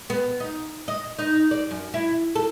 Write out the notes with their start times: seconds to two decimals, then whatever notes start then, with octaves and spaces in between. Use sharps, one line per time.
0.10 B3
0.40 D#4
0.88 D#5
1.19 D#4
1.51 D5
1.71 F#2
1.94 E4
2.35 A4